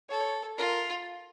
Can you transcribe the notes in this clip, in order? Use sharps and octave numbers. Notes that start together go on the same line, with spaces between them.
A4 C#5
F4 A#4